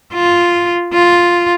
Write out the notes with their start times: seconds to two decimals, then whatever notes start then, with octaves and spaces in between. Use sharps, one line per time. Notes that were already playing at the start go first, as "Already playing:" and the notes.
0.14 F4
0.93 F4